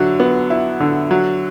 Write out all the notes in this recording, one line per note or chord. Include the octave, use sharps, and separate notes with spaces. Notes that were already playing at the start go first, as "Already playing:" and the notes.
Already playing: D3 F#3 E4
B3
E4
D3
F#3